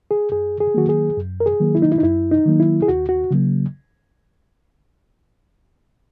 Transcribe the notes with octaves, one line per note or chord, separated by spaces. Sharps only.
G#4
F#2 G#4
G#4
D#3 F#3 A#3 F#4
G#4
F#2
A#4
G#4
D#3 F#3 A#3
E4
D#4
E4
D#4
F#2 E4
D#4
D#3 F#3 A#3
E4
G#4
D#2 F#4
F#4
C#3 F#3 A#3